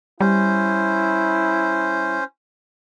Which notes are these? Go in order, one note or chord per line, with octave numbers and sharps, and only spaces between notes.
G3 C#4 E4 C5